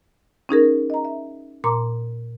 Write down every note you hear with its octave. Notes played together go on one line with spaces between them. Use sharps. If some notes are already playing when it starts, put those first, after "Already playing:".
C#4 D#4 G#4 A#4
D#5 A#5
E5
A#2 A#5 C6 D6